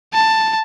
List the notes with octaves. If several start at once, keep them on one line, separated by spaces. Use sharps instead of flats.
A5